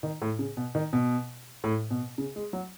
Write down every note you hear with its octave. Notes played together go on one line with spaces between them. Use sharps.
D#3
A2
C#3
B2
D#3
B2
A2
B2
C#3
G#3
F#3